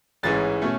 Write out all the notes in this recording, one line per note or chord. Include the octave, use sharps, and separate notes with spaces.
A1 G#2 E3 G#3 C#4 A6
B2 A3 C#4